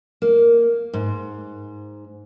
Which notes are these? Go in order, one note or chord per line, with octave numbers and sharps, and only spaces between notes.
A#3
G#2